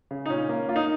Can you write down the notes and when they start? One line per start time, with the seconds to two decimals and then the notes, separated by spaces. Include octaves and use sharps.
0.11 C#3
0.26 D#4
0.30 A#2 C#4
0.49 A#3
0.68 A#3 F4
0.76 D#4